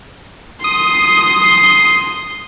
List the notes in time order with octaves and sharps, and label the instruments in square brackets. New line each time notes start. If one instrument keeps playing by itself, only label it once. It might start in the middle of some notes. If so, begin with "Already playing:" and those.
[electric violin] C6 [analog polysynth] D#6